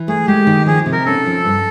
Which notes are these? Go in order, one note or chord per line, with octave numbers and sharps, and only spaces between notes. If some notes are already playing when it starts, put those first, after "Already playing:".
Already playing: E3
A3 G#4
G#3 G4
D#3
F3 G#4
C3
A#4
C#4 A4
F3
G2